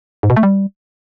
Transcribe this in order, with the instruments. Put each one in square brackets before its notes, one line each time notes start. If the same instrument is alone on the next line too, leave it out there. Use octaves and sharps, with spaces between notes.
[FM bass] G#2
B2
A3
G3